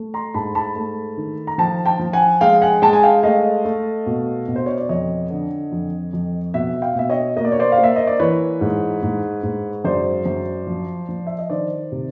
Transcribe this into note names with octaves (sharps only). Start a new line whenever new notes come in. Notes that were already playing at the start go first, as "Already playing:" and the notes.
Already playing: A3
A#5 C6
G#2 A5 B5
A5 B5
A3
D#3
A#5
F3 G5 A5
G5 A5
F3
F#5 G#5
G#3 F5 G5
F#5 G#5
G#3 G5 A5
G#5
F5 G5
A3 D#5 F5
A3
B2
B2
C5
C#5
D5
F2 C#5 D#5
D3
F2
F2
B2 E5 F#5
F5 G5
B2 E5
C#5 D#5
A#3 D#5
D5
C#5
C5 D5
F5
A#3
E5
D#5
D5
E3 B4 C#5
G#2
G#2
G#2
F#2 C5 D5
F#2
F3
F3
E5
D#5
D#3 C5 D5
C3